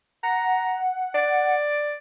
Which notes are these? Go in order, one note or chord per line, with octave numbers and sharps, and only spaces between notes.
F#5 A#5
D5